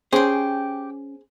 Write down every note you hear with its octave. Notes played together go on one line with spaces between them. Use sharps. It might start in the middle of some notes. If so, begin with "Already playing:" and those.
C#4 G4 G#4 C5 G5